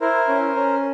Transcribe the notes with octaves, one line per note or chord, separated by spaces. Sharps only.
E4 A#4 C5
C#4
C#4